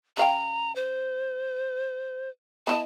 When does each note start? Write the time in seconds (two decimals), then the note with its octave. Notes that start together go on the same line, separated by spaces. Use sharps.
0.17 C#3 F5 G5 A#5
0.76 C5
2.67 B3 E4 D#5 A5